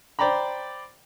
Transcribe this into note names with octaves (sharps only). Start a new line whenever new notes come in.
C5 D5 G5 A#5 B5